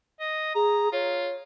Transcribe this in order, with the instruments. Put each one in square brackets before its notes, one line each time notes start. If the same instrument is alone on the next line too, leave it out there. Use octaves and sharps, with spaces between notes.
[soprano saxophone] D#5
[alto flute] G#4 [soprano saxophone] A#5
[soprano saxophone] F4 [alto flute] C#5